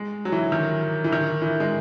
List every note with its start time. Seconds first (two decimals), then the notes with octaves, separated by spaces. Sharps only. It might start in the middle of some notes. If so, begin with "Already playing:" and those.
Already playing: G#3
0.25 F#3
0.32 E3
0.52 D#3
1.04 E3
1.12 D#3
1.42 E3
1.60 G#3